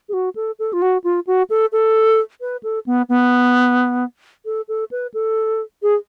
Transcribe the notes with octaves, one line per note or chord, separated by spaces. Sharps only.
G#4
F#4
A4
A4
F4
F#4
F4
F#4
A4
A4
B4
A4
B3
B3
A4
A4
B4
A4
G#4